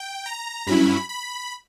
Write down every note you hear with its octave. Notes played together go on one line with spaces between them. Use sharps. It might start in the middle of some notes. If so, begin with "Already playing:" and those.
Already playing: G5
A#5
G2 F#3 C#4 E4 B5
B5